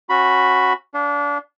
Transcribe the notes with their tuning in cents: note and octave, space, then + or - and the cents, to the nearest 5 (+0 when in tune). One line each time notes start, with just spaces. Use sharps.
C#4 -30 F#4 -5 B5 +0
D4 -25 F5 +10